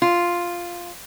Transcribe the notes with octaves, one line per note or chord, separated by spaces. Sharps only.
F4